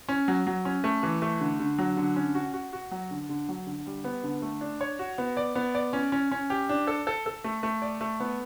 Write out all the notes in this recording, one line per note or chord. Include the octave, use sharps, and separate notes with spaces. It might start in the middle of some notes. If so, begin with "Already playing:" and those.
C#4
F#3
F#3
C#4
A3
E3
A3
D3
D3
F#3
D3
C#4
F#4
F#4
F#4
F#3
D3
D3
F#3
D3
G3
B3
D3
A3
D4
C#5
F#4
B3
D5
B3
D5
C#4
C#4
C#4
G4
D4
A4
A4
A4
A3
A3
D5
A3
B3